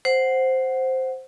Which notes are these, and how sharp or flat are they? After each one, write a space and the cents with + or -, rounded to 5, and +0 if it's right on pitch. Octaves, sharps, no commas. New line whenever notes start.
C5 +0 F#5 +0